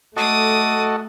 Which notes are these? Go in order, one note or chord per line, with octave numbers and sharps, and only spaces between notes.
A3 F#4 A4 D#5 D6 D#6